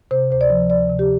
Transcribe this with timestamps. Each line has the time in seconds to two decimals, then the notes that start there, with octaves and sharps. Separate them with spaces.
0.11 C3 C5
0.31 D2 C5
0.41 D5
0.50 F3
0.70 D2 D5
0.89 C3
0.99 G4